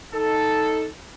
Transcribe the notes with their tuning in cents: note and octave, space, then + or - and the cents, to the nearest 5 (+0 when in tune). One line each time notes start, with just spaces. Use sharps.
D#4 +15 A4 +0